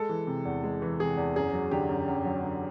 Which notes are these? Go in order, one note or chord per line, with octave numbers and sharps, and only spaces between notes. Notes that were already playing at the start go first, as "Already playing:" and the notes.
Already playing: G#3 A4
E3
C3
E2
G#3
E3
C3 G#4
E2
F#2 G#4
F#3
D3 G4
F#2
F#2
F#3
D3